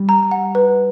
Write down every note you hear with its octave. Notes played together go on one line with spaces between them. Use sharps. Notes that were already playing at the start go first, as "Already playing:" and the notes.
Already playing: G3
A#5
F#5
B4